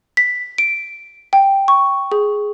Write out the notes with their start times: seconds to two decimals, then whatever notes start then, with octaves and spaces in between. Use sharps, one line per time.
0.17 B6
0.58 D7
1.33 G5
1.68 C#6
2.12 G#4